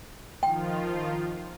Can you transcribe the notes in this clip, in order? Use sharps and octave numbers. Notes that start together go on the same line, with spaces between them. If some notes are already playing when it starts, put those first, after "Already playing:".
D#3 F3 F4 G5